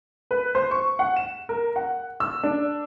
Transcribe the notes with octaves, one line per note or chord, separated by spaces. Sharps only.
B4
C5
C#6
F#5
E7
A#4
F#5
E6
D4